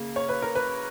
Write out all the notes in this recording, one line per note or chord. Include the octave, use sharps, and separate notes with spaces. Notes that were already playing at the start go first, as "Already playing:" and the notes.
Already playing: C#3 A#3
C#5
B4
A#4
B4